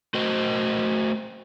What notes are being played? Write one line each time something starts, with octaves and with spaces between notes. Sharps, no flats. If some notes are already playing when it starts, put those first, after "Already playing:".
A3 F#4 C5 D#5